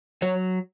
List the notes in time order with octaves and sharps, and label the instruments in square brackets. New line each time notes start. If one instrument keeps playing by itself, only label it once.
[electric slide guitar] F#3 C#5